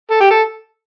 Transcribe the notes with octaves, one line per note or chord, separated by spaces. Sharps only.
A4
G4
A4